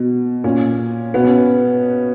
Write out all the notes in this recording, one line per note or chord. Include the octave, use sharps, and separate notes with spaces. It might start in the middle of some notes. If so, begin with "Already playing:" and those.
Already playing: B2
A#2 C#4
B2 B3
C#4